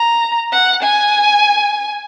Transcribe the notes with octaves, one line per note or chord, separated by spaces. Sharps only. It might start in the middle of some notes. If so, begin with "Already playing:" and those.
Already playing: A#5
F#5
G#5